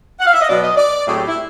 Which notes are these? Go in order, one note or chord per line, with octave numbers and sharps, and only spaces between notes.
F#5
F5
E5
D#5
B2 F#3 B3 D5
D#5
D5
A2 F#3 A3 C4 G#4
G4
E4